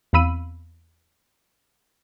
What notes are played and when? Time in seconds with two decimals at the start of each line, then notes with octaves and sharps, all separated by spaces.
0.13 E2 C4 F5 B5 E6 D#7